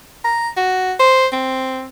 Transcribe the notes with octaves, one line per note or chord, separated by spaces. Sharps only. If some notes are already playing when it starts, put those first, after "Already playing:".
A#5
F#4
C5
C4